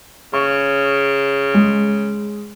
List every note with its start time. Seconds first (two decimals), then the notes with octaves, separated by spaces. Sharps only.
0.33 C#3 C#6
1.54 G#3